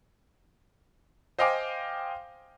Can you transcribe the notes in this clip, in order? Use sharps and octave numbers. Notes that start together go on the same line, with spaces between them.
C5 D#5 F5 G5 G#5 D6